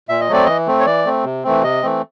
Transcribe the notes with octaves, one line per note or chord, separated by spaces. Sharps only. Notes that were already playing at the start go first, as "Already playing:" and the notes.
A#2 E5
D#5
F#3 A3 C4 D5
E3 D#5
A3 C4
C#5
E3 D5
A3 C4
C3
E3 A3 C4
C3 D#5
E3 A3 C4